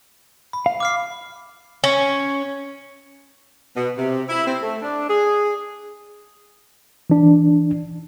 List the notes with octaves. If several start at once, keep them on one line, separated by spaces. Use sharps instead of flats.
B5
F5
D6 F6 C7
C#4
B2
C3
E4
C4
A3
D4
G#4
E3 D4